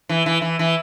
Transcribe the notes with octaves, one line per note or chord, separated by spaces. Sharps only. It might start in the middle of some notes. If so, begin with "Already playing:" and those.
E3
E3
E3
E3